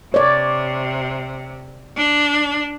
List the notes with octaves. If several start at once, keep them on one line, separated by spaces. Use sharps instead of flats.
C3 C#5 D5
D4